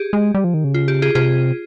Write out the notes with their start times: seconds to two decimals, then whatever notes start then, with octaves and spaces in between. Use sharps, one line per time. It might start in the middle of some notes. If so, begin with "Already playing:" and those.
Already playing: G4 G#4
0.13 G#3
0.35 G3
0.44 F3
0.54 D#3
0.64 C#3
0.74 F4
0.88 G4
1.02 F4 G#4
1.15 C3 F4 G#4